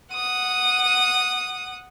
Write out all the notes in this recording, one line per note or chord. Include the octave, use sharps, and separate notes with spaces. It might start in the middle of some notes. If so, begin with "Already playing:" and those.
F#5 D#6